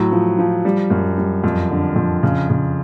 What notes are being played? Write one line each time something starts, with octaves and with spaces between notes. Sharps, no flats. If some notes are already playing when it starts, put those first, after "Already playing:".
Already playing: A2 F#3
F3
F3
G3
F#2
G3
F2
D3
F2
C#3
C#3